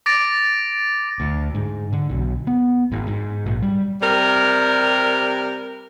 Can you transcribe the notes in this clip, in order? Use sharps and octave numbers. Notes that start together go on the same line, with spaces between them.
D6 A6 A#6 D7
D2
G#2
D3
B1
B3
G#1
G#2
A#1
G3
C3 G3 A#4